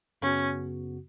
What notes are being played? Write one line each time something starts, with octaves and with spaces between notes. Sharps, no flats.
F#2 C#3 B3 C#4 F#4